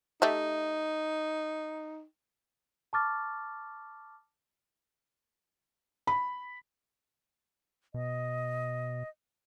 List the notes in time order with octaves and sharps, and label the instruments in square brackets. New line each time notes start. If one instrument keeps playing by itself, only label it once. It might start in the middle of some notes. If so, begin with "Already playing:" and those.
[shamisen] A3 G4 E5 [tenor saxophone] D#4
[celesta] A5 C#6 D6 F6 A6
[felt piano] B5
[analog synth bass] B2 [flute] D#5